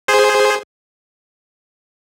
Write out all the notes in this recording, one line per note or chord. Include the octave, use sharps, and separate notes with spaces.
G#4 C5